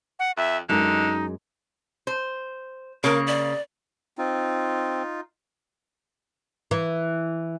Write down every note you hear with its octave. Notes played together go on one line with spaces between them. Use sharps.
F#5
F2 E5
F#2 D3 G#3 D#4
C5
C#3 A#3 A#4
D5
C4 D#4 F4
E3